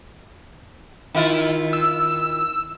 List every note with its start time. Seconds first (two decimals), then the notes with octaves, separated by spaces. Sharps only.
1.14 D#3 E4 F4
1.73 E6